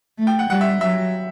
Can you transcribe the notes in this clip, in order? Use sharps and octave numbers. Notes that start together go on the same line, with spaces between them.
A3
G5
F#5
G3 F#5
E5
F#3 E5